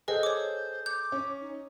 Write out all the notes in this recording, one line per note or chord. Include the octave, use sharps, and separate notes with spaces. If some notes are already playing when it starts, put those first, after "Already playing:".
G#4 A4 B4 C5 D#5
C#5 D6
D6 G6
C#4
D#4